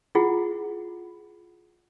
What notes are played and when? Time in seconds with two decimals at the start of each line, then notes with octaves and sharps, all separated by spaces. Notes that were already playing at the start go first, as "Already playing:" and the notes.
0.15 E4 F4 G#4 F#5